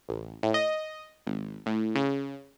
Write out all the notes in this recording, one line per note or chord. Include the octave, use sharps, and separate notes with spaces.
A1
A2
D#5
G#1
A2
C#3